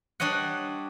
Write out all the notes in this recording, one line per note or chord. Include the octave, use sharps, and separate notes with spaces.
G3 D4 C#5 D#5 F#5